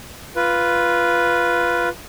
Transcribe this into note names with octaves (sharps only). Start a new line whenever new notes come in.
F4 B4